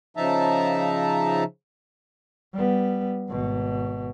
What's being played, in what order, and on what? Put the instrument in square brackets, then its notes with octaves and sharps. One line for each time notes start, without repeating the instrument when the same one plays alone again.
[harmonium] C#3 F3 D#4 E5 A5 A#5
[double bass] G3 B3
G#1 B2